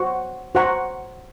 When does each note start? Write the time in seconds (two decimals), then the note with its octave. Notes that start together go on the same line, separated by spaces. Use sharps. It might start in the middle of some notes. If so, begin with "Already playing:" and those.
Already playing: F#4 C5 F#5 C#6
0.55 F#4 C5 F#5 A#5 C#6